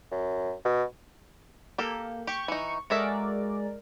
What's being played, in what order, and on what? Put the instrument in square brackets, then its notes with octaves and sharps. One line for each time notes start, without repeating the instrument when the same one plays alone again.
[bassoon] F#2
B2
[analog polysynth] A#3 [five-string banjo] G4 A4
[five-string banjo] G4 [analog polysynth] C#6
[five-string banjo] E3 D#4
[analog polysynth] G#3 A#4 D5 [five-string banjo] F#4 A4 E5